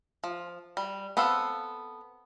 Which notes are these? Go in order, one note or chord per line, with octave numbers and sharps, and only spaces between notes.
F3
G3
B3 C4 A4 F5